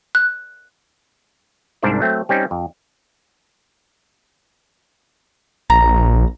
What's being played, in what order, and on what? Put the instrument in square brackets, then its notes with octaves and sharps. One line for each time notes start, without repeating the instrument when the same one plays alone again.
[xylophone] F#6
[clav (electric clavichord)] C2 G#2 D4 A#4 C5 D5
F#3 A3 C4
G3 C4 C#4 D#4
F2
[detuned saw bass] A#1 [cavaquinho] A#5